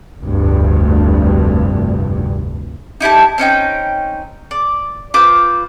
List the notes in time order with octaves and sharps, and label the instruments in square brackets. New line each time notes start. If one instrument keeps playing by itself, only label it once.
[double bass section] F1 D2 G2
[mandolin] D#4 E4 G4 A5
C4 C#4 D#4 G5
D5
F4 B4 C5 D6